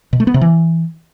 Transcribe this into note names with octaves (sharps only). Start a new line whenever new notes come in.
B2
A3
B3
C3
E3